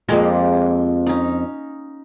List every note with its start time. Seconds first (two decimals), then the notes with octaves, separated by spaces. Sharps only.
0.09 F2 F3 G#3 A#3 G4
1.07 C#4 D#4